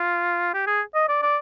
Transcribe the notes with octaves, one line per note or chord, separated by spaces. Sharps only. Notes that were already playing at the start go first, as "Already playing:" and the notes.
Already playing: F4
G4
G#4
D#5
D5
D5